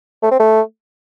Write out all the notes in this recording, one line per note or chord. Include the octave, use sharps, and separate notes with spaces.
A3
C4
A3